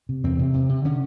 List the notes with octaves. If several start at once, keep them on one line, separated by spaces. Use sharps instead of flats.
C3
E2 C4
C3
C3
C3
D3 C#4